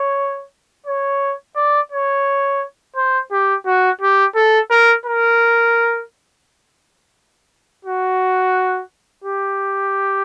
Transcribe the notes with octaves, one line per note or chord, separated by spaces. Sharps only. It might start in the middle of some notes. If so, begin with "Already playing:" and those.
Already playing: C#5
C#5
D5
C#5
C5
G4
F#4
G4
A4
A#4
A#4
F#4
G4